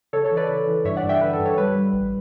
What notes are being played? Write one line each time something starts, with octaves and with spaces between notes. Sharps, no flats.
C#3 A4 C#5
A4 C#5
E3
B4 D5
C#3
E3
G2 C#5 E5
D5 F#5
G2
E5 G5
D3 B4
A4
G2
A4 C#5
G3 B4
G3
A1